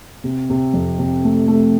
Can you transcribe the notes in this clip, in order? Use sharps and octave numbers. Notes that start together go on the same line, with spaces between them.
C3
C3
F2
C3
A3
A3